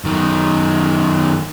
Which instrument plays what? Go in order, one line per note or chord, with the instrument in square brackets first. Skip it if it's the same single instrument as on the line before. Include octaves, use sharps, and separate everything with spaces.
[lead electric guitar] F#2 D#3